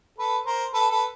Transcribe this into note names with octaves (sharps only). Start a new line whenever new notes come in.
A4 B4
A#4 C5
A4 B4
A4 B4